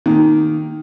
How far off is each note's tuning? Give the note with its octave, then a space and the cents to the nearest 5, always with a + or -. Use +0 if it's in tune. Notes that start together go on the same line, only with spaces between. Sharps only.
D#3 +0 A#3 +0